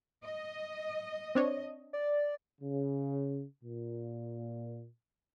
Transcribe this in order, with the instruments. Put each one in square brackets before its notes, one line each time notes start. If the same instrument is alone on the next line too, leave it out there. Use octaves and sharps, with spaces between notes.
[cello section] D#5
[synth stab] C4 D4 C#5
[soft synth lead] D5
[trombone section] C#3
A#2